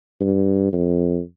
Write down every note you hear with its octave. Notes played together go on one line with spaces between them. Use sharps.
G2
F2